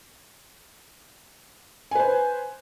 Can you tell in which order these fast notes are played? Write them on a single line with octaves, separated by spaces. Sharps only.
G#5 B4 C5